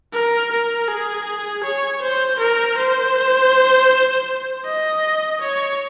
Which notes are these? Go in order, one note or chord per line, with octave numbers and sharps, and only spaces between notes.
A#4
A#4
G#4
C#5
C5
A#4
C5
D#5
C#5